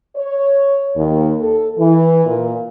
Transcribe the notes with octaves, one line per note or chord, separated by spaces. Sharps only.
C#5
D#2
A4
E3
A#2